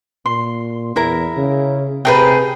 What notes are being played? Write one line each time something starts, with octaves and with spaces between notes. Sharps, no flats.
A#2 C6
E2 E4 A#4 A#5
C#3
C3 A3 G#4 A#4 B4 G5